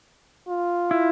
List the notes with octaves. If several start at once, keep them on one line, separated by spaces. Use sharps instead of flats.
F4
E4